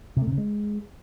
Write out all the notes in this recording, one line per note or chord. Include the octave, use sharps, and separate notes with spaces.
C3
A3
C3
C#3
G#3